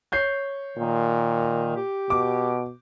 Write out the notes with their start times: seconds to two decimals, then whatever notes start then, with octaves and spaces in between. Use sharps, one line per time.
0.12 C#5 G6 C7
0.77 A#2 D#3
1.76 G4
2.10 B2 D6